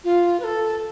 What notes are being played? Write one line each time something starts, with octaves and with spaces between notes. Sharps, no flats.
F4
B4
A4